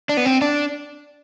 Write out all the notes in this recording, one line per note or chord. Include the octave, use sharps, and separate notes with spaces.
D4
B3
C4
D4